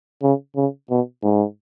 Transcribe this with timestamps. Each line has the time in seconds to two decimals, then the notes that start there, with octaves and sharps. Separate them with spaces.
0.23 C#3
0.56 C#3
0.90 B2
1.23 G#2